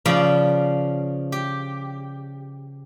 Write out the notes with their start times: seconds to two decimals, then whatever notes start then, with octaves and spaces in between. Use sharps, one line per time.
0.05 C#3 F3 D5 B5
1.32 G4